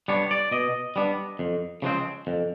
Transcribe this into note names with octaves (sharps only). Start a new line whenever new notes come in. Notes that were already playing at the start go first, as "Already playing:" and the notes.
G3 B3 D4 C#5
D5
B2 D#5
G3 B3 D4
F2
C#3 F3 G#3 C4
F2